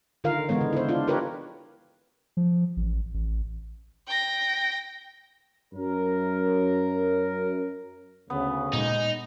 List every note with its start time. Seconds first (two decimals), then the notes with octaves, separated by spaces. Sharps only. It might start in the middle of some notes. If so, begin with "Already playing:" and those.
0.24 D3 D#3 F4 A#4 F5
0.49 D3 E3 G#3 B3 C#5
0.61 C#3
0.73 E4 C5
0.89 D4 F4
1.07 D4 F4 G4 A#4 B4 C#5
2.37 F3
2.77 A1
3.14 A1
4.07 G5 A#6
5.73 F#2 A#4
8.30 D2 C#3 B3
8.73 A#2 G#3 D#4